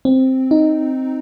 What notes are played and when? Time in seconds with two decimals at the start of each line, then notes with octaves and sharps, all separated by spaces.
0.05 C4
0.51 D#4